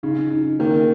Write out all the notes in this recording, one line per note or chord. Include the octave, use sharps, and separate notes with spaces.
C#3 D#4
D#4
D#3 A#3